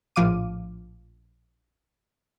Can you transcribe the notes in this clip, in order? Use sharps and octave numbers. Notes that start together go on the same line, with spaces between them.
A#1 A2 F3 F5 D6 D#7